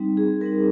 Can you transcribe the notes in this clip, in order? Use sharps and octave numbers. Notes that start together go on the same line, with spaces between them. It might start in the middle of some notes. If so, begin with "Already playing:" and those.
Already playing: G3 C4 D#4
G#4
G3 C4 D#4 A#4